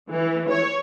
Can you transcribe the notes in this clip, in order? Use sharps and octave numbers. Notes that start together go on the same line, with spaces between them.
E3
C#5